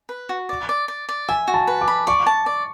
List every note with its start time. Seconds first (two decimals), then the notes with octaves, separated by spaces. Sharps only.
0.09 B4
0.29 F#4
0.49 D5
0.69 D5
0.88 D5
1.09 D5
1.28 E5 G#5
1.48 F#4
1.54 A5
1.67 B4
1.81 D6
1.88 B5
2.07 D5 C#6
2.27 A5
2.46 D5